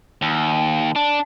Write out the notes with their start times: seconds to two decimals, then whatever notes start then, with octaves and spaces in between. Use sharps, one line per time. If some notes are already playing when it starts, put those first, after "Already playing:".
0.22 D#2
0.96 D4